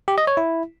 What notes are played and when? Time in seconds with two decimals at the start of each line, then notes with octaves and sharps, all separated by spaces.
0.08 G4
0.18 D#5
0.27 C#5
0.37 E4